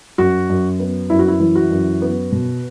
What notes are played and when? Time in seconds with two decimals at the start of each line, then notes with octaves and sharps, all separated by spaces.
0.18 F#2 F#4
0.49 F#2
0.79 B3
1.10 F#2 E4
1.19 F#4
1.28 E4
1.40 E3
1.55 F#4
1.70 F#2
2.02 B3
2.32 B2